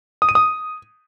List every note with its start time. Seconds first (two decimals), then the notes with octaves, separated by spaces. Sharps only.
0.22 D#6
0.29 D#7
0.35 D#6